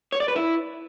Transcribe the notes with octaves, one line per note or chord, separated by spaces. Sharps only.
C#5
D5
B4
E4